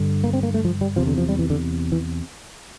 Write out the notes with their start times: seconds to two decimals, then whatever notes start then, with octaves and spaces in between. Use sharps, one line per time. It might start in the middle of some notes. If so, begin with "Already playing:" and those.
Already playing: G2 D3
0.24 A#3
0.33 C4
0.43 A#3
0.54 A3
0.65 F3
0.81 G3
0.96 E2 C3 F3
1.07 D3
1.18 F3
1.28 G3
1.39 E3
1.50 D3
1.92 E3